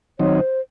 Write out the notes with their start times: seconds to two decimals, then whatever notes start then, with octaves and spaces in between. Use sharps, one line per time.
0.19 D#3 F#3 C4 D#4 C#5
0.39 C5